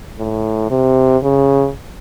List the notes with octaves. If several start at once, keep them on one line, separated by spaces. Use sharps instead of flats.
A2
C3
C#3